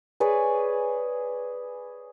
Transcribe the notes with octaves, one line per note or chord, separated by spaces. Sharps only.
G#4 B4 C#5 D5